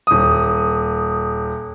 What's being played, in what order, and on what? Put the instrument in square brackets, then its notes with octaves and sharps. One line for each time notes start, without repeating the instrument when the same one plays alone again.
[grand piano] D#1 D#6